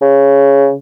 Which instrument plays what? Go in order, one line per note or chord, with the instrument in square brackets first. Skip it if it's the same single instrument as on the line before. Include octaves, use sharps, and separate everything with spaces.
[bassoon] C#3